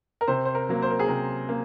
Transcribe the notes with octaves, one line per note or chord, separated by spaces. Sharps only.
A#4
C3 C5
C5
A#4
F#3 A#3
C5
A#4
G#4
C3 A#4
A#3